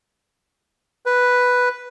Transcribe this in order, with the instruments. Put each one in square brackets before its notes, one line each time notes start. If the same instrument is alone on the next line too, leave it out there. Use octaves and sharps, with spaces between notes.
[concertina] B4